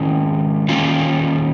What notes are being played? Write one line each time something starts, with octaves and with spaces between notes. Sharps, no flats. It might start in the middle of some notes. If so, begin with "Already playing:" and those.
Already playing: G#2 D#3 G#3 C#4
D#3 A#3 C#4 F4